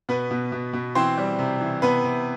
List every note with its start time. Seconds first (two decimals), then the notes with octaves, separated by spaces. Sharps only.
0.09 B2 B3 B4
0.31 B2
0.52 B2
0.73 B2
0.95 E3 C4 C5
1.18 G3
1.39 C3
1.61 E3
1.82 C3 B3 B4
2.04 C3